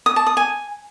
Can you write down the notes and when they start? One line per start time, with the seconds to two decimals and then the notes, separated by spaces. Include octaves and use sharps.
0.06 D#6
0.16 A5
0.27 D#6
0.37 G#5